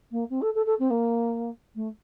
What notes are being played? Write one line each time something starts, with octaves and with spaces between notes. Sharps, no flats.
A#3
C4
A4
A4
A4
C4
A#3
A3